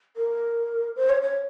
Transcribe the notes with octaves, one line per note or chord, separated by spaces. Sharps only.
A#4
C5
C#5
C#5